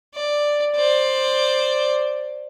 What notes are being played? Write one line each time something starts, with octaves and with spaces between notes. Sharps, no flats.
D5
C5 D5